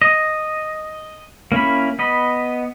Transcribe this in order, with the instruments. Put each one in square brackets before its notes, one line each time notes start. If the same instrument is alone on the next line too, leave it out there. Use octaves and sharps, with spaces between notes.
[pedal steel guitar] D#5
A#3 C#4 E4 B5
B3 D#5 B5